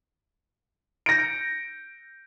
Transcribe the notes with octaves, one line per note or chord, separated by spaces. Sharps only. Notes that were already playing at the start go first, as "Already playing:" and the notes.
G6 A#6 C#7 D7